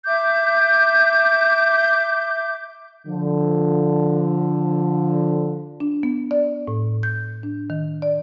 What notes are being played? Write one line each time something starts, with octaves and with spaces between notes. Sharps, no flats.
E5 D6 G6
D3 F3
D4
B3
D5
A2
G6
D4
D#3
D5